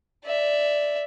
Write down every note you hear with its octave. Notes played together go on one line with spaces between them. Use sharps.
D5 E5